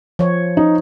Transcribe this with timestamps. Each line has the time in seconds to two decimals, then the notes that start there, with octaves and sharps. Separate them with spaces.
0.19 F3 C#5
0.57 D#4